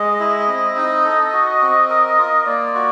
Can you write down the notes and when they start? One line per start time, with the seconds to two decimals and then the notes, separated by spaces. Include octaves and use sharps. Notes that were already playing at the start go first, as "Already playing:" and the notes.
Already playing: G#3 D#5
0.20 E4
0.48 C4
0.76 D#4
1.05 A4
1.33 F#4
1.62 C4
1.89 A#4
2.18 F4
2.46 A#3 D5
2.74 F#4